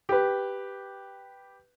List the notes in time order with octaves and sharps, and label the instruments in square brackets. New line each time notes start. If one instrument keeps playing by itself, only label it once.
[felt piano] G4 B4